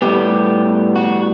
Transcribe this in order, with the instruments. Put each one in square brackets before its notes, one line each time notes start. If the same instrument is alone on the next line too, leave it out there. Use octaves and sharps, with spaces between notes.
[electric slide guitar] A2 G3 B3 G4
F#4